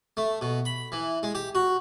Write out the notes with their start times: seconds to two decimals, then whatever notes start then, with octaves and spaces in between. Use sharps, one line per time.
0.17 A3
0.42 B2
0.65 B5
0.92 E3
1.23 G#3
1.35 G4
1.55 F#4